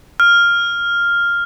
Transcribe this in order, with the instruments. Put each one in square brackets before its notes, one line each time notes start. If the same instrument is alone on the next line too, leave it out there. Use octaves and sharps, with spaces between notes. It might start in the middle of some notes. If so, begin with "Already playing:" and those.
[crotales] F6